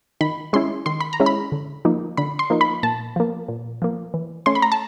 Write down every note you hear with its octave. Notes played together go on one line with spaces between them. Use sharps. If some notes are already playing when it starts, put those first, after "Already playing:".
D#3 B5
G#3 C#4 E4 C6
D#3 C6
B5
A#5
G#3 C#4 E4
B5
D3
F3 A#3 D#4
D3 B5
C6
F3 A#3 D#4
B5
A#2 A5
F3 A#3
A#2
F3 A#3
E3
A3 C#4 C6
B5
A#5
A5